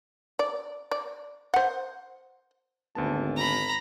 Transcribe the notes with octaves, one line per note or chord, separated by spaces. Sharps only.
D5
D5
C5 F#5
G#1 D2 B3 A5
A#5 B5